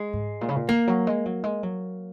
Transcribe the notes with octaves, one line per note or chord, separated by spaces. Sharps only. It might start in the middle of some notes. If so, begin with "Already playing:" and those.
Already playing: G#3
G#2
A#2
C#3
A#2
D#3 A#3
F#3
G#3
F#3
G#3
F#3